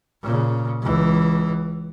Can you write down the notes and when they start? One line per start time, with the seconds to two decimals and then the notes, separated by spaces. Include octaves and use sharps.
0.23 A#2 C#3
0.82 C#2 E3